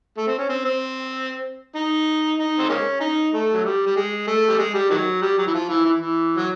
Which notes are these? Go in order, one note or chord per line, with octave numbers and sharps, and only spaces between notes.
A3
C4
C#4
C4
C4
D#4
D#4
C4
G#3 A#3 C#4
D#4
A3
F#3
G3
G3
G#3
A3
G3
G#3
G3
D#3 F#3
G3
F#3
E3
F3
E3
E3
E3
F#3